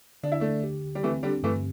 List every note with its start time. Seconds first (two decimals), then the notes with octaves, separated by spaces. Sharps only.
0.23 D3 D4
0.32 E4
0.40 A3 D4
0.64 G4
0.95 G3
1.03 E3 A3 C4
1.23 D3 G3
1.43 G2 E3 A3